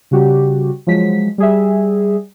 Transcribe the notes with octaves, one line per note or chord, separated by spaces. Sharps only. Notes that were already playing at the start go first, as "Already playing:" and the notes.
C#3 G3 F#4 G4
F3 F#3 G#3 B6
G3 G#4 E5